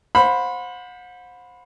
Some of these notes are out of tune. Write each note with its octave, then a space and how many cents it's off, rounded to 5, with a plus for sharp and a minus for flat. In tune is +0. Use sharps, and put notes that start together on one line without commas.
C5 +10 F#5 -40 B5 +0